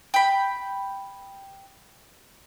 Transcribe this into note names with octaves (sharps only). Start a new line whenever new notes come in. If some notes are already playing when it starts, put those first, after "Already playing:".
G5 B5